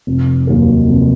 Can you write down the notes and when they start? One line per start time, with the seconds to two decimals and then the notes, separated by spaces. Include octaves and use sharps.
0.07 F1
0.47 D#2 D#3 F#3 A#3
0.88 F1